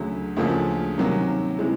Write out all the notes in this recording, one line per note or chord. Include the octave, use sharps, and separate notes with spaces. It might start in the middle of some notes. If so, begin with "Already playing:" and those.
Already playing: D2 C#3 F#3
D2 C#3 F3 A#3
C3 D#3 F#3 A#3 C#4
C3 E3 G#3